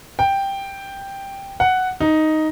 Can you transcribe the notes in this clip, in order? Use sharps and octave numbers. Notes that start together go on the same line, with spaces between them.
G5
F#5
D#4